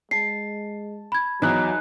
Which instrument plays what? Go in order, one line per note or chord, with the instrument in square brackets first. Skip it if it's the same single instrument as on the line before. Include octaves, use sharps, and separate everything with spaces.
[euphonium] G#3 [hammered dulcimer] A5 [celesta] C7
[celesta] B5 G#6
[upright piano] E2 F#6 [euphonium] F#3 [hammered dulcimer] D#4